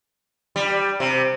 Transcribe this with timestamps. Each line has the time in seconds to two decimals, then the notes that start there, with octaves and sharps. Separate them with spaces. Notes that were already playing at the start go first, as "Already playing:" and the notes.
0.56 G3
1.00 C3